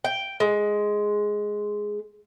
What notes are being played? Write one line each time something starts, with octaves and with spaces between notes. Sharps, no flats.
G5
G#3